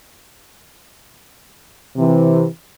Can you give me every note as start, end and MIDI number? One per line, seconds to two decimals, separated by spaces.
1.97 2.45 48
1.97 2.45 52